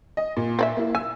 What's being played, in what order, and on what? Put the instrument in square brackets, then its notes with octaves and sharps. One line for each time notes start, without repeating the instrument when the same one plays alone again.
[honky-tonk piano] D#5
A#2
[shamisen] C4 D5 E5
[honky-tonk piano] A#3 E4
[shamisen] G#5 [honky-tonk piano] E6